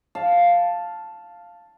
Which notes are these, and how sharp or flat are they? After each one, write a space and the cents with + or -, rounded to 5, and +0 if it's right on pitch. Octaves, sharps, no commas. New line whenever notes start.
F5 +0 A5 +0